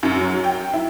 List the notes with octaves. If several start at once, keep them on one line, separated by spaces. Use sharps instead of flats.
F#2
F#3
G5
E4